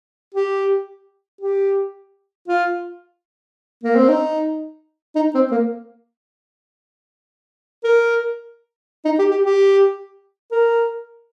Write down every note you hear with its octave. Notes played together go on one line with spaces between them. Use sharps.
G4
G4
F4
A#3
C4
D#4
D#4
C4
A#3
A#4
D#4
G4
G4
G4
A#4